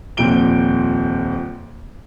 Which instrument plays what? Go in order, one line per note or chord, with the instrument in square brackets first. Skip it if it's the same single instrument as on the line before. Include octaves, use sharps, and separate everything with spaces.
[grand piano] D#1 F2 A#2 D7 G7